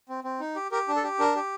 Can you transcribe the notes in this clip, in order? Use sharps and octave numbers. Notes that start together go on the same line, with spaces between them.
C4
C4
D#4
G4
G4 A#4
D4
A4
G4
D4 A#4
G4